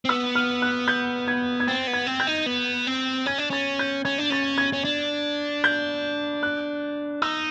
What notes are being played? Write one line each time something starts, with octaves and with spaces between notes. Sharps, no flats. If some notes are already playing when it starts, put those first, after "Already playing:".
C4
B3 E6
F6
F#6
G6
G#6
G#6
C4 A6
B3
G#6
C4
G6
D#4
B3
C4
C#4 G#6
D4
C#4 A6
G6
C#4 G#6
D4
C#4 A6
G#6
C#4
D4
G6
F#6
D#4 E6